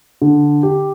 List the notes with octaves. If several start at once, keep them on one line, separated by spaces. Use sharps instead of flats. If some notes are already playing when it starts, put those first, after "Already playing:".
D3
G4